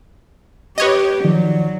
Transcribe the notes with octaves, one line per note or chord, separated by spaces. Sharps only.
G4 B4 C#5 D#5
D#3 F3 F#3 D5